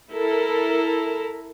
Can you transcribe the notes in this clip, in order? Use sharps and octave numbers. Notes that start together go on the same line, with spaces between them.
E4 A4 A#4